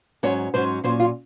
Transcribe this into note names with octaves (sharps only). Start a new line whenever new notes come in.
G#2 F#3 C#4 C#5
G#2 F#3 C#4 C5
A#2 F#3 C#4 C5
F4